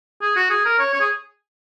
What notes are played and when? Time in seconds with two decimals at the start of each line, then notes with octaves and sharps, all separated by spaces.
0.22 G#4
0.36 F#4
0.50 G#4
0.66 A#4
0.79 C#5
0.94 C#5
1.01 G#4